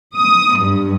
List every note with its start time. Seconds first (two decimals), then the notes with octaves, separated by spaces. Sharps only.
0.16 D#6
0.59 G2